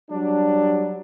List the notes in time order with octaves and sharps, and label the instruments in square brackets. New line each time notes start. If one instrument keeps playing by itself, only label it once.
[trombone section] F#3 G3 D4